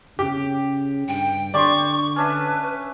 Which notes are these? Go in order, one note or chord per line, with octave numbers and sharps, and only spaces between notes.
C#3 G4
G2 G5
D3 G4 D5 C6 C#6
C#4 D4 B4 E5